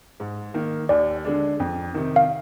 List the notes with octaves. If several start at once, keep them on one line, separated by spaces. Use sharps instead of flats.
G#2
D#3 A#3
D#2 D5
D3 G#3 D4
F2
C3 D#3
F5